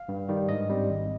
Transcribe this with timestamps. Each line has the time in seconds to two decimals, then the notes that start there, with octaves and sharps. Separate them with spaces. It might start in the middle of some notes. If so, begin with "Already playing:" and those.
Already playing: F5
0.09 G2
0.29 D#3 G3
0.49 G#2 D#5
0.69 G3 C4
0.90 G#1